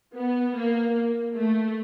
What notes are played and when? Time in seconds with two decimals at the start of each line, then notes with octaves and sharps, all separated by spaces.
0.16 B3
0.56 A#3
1.36 A3